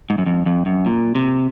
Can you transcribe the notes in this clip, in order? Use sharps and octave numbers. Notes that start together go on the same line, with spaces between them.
G#2
F#2
F2
F2
F#2
A#2
C3